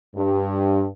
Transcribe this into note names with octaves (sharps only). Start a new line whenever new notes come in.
G2